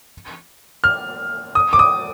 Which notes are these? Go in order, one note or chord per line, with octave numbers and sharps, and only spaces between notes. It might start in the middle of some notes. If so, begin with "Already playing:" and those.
F6
D#6
D6
D#6